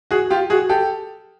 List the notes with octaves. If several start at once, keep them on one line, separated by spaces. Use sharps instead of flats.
F#4 G#4
F4 G4
F#4 G#4
G4 A4